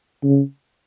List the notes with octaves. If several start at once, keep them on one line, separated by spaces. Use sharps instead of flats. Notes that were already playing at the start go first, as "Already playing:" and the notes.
C#3